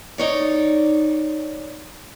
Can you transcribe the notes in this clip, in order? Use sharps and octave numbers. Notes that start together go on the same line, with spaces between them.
D#4 C#5 D5